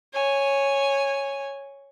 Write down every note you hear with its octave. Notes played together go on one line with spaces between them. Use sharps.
C#5 G#5